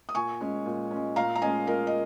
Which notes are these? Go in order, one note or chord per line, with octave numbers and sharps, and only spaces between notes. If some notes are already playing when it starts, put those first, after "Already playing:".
D#6
A#2 G#5 C#6
G#3 C#4
A#2
G#3 C#4
A#2 F5 A#5
A#5
G#3 C#4 D#5 G#5
A#2 A#4 D#5
D#5